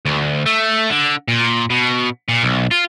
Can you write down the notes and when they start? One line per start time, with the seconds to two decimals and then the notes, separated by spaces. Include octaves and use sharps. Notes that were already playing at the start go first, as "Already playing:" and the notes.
0.06 D2
0.46 A3
0.90 D3
1.28 A#2
1.70 B2
2.29 A#2
2.43 B1
2.71 F4